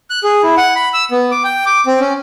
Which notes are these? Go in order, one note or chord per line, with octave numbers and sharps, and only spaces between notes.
F#6
G#4
E4
F#5
B5
E6
B3
D6
G5
D6
C4
C#4